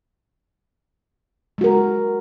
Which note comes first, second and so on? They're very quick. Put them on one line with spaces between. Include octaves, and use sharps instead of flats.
G#3 F#4 A#4